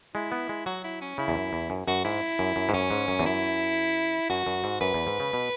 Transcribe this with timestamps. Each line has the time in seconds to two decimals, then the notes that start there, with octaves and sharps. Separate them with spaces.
0.15 G#3 E4
0.32 B3
0.49 G#3
0.66 F#3 F#4
0.84 E4
1.01 C#4
1.18 C#3 E4
1.28 E2
1.36 F#2
1.53 E2
1.70 F#2
1.88 F#2 F#4
2.04 G#2 E4
2.39 F#2
2.56 F#2
2.69 G#2
2.74 F#2 C#4
2.91 G#2
3.08 F#2
3.19 E2
3.25 F#2 E4
4.29 F#2 F#4
4.47 F#2
4.64 G#2
4.81 F#2 B4
4.94 E2
5.07 G#2
5.20 C#3
5.33 B2